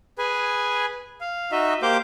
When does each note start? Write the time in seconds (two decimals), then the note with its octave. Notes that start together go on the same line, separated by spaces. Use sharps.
0.18 G#4 B4 G#5
1.21 F5
1.52 D#4 F#4 D#5 E5
1.82 A#3 G4 C5 F5 D6 G6